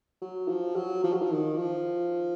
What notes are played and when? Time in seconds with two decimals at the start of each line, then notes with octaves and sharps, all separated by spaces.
0.21 F#3
0.48 F3
0.75 F#3
1.04 F3
1.13 F#3
1.21 F3
1.31 D#3
1.57 F3